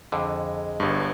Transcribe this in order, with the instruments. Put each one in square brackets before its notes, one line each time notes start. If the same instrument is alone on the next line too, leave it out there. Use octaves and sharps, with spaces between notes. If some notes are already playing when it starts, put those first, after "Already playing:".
[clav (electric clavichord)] F2 D3 [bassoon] G#3
[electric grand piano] G1 G2